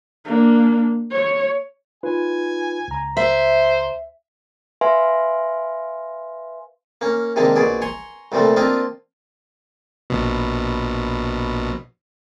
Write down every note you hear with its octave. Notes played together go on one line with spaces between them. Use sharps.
A#3 D4
C#5
D#4 F4 B4 G#5
C#2 A#5
C5 E5
B4 E5 F5 G#5 C6
A#3 C#4
C3 D#3 G#3 A#3 D4
A#1 B2 G#4 D5
G#5 A#5 C6 C#6
C2 A#2 F3 G3 A3
A#3 C4 D4 F4 D#5
A#1 B2